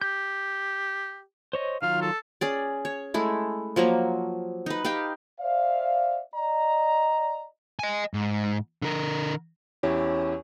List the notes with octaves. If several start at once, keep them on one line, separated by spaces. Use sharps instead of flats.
G4 G6
C5 C#5 D#5
D#3 F#3 F4 F5
A4
C#4 G#4 D5
C#5
G#3 A3 E4
F3 F#3 A#3 C#6
D#4 B4
D#4 G4 F5 G5
C5 D5 E5 F5
D5 D#5 A#5
D#5 G#5
G#2
D3 A#4
E2 C#4 E4 G4